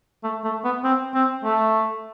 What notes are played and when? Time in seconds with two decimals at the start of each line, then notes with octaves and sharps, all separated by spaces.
0.23 A3
0.44 A3
0.64 B3
0.84 C4
1.14 C4
1.44 A3